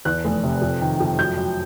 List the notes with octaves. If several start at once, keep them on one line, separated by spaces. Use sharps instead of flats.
E2 F#6
F1
C3
F2
D#3
F2
F#2 G6
F#2